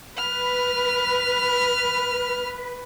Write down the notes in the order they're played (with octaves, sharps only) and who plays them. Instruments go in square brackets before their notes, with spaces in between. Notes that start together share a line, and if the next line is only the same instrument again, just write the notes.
[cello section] B4 [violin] F6